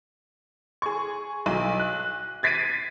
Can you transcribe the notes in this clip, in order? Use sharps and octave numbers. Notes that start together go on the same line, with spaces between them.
G#4 C#6
B1
F#6
G#6 A6 B6 C7 D7 D#7